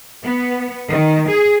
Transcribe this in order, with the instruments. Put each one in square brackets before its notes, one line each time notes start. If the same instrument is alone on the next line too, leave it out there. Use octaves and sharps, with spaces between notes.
[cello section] B3
D#3
G#4